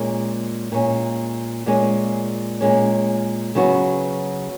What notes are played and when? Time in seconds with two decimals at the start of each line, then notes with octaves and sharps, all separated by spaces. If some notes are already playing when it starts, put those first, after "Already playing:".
Already playing: A#2 G#3 C#4
0.72 A#2 G#3 C#4
1.66 A#2 G#3 C#4
2.60 A#2 G#3 C#4
3.55 C#3 F#3 B3 F#4 B4